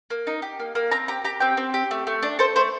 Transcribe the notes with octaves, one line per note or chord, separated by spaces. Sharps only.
A#3
D#4
G4
A#3
A#3
C4 A#5
G4 A#5
G4 A#5
C4 G5
C4
G4
A3
A3
D4
A4 C5
A3 C5